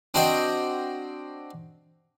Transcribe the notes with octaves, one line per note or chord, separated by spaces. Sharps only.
C4 D4 F#4 D#5 G5